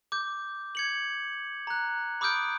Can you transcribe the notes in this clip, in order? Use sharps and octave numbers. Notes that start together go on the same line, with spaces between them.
D6 G6
G#6 C#7 F#7
A#5 F#6
B5 D6 D#6 F6 G6 D7